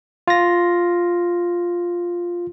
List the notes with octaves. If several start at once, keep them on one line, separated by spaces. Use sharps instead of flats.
F4 A#6